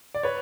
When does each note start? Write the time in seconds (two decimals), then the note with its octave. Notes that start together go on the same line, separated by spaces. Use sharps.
0.14 D5
0.23 B4 C#5